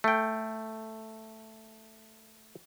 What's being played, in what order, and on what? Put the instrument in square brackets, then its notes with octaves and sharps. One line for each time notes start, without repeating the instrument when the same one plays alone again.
[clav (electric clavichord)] A3 G5